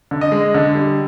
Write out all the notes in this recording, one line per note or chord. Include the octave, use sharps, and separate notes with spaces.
D3
D#5
G#3
D3
G3